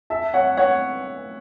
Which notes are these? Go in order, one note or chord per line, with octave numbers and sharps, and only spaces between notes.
E5 A5
C#5 F#5
C#5 F#5